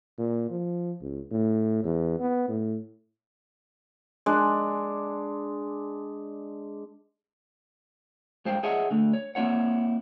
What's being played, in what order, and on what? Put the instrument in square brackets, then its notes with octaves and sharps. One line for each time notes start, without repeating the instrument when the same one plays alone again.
[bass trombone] A#2
F3
C#2
A2
E2
B3
A2
[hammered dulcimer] G#3 D4
[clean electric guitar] G2 G#3 C5 F5 G5
G#4 C#5 D#5 E5 F#5 G#5
D3 A3
C#5
A#3 C4 E4 C#5 F#5